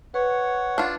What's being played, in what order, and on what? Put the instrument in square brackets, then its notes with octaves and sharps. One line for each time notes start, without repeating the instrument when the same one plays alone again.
[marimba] B4 [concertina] C#5 F#5
[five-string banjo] D4 F4